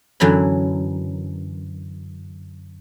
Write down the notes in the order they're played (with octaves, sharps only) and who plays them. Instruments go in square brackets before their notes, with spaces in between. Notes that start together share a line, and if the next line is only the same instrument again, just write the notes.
[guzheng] F#2 D3 E3 F#3 B5